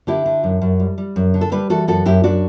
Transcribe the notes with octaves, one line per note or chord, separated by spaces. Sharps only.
D3 E4 G4
D3
F#2
F#2
G3
G3
F#2
D3
A4
G3 G4 B4
E3 F#4 A4
F#2 F#4 A4
F#2 E4 G4
F#2 D4 F#4